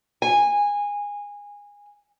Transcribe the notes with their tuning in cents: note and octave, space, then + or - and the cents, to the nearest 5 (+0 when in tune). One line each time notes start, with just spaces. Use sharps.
G#5 -20